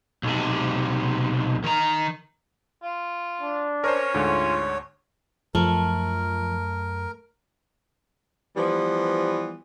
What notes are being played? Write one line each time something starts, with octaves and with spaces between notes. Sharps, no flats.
B1 C3
D#3 A#5
F4
D4
C#4 A#4 C5 C#5
D2 G#2 D3 F4
F#2 F3 A3 A#4
E3 F3 G3 B3